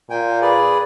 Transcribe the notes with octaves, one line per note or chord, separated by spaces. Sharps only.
A#2 G5 G#5
G#4 B4 D5